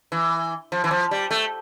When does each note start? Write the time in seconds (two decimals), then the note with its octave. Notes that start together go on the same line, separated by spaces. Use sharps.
0.12 E3
0.72 F3
0.84 E3
0.91 F3
1.11 G3
1.31 A3